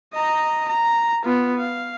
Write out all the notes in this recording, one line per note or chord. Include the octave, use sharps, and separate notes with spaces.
D#5 A#5
A#5
B3 F4
F5